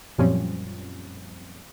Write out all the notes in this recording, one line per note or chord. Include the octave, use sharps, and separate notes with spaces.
F#2 A#2 F3 G3 C4 C#4